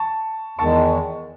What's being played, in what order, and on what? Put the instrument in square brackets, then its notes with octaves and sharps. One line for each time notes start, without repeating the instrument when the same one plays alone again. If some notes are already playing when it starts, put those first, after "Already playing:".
Already playing: [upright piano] A5 C#6
[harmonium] E2 D#3 G#3 [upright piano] A5 C#6